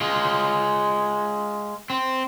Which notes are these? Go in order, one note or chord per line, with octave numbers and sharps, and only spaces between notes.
G#3 F4
C4